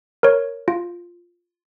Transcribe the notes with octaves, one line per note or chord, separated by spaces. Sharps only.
A#4 C#5
F4